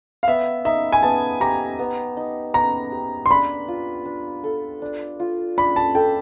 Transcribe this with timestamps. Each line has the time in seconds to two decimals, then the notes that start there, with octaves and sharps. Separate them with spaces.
0.23 F5
0.28 B3 E5
0.65 D#4 E5
0.92 G#5
1.03 B3 A5
1.40 G4 A#5
1.79 B3
2.17 D#4
2.54 B3 A#5
2.92 G4
3.26 C6
3.29 D4 B5
3.68 F4
4.05 D4
4.44 A4
4.82 D4
5.20 F4
5.57 D4 B5
5.76 A5
5.95 A4 G5